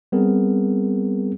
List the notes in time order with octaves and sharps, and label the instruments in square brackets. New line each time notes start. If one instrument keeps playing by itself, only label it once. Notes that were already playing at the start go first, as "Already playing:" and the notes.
[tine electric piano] G3 B3 C4 G#4 A#4